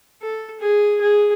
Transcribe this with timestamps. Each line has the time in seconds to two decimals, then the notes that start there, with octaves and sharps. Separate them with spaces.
0.22 A4
0.61 G#4
1.01 G#4